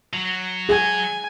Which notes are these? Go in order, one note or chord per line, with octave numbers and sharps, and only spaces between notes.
F#3
G#4 G#5